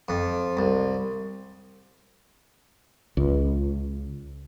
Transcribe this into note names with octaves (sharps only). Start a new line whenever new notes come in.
F2
C2
C#2